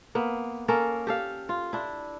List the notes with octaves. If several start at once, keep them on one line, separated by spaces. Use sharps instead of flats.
A#3 B3
A#3 C#4 A4 A#4
G4 A4 F5
F4
D4 E4